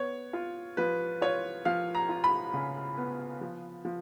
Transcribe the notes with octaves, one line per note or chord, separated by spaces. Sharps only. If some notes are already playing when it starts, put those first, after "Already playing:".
Already playing: B3 C#5
F4
F3 B4
F4 C#5
F3 F5
A#5
F4
B5
C#3
B3
F3
F3